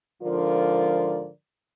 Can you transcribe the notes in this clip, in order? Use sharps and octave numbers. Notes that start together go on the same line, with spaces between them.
G#2 D3 F3 F4 A#4 D5